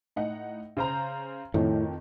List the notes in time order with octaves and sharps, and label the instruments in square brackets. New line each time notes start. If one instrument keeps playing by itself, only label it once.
[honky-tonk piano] A2 D#4 F#5
C#3 C5 A#5
[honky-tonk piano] F2 D#3 [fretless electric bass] A2